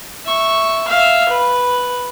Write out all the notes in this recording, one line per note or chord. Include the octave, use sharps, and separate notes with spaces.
E5 C#6
E5 F5
B4